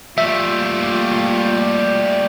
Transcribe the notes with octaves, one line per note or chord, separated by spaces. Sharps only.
G3 A3 A#3 F4 E5